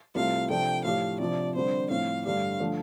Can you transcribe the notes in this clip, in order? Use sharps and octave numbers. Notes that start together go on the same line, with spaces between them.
C2 C3 A3 F4 F5
C3 F3 D4 A4 G5
A2 F3 D4 G4 F5
C3 F3 D4 D5
D3 G3 C4 C5
A2 F3 C4 F5
G2 D3 A3 D4 G4 F5
D3 F3 A3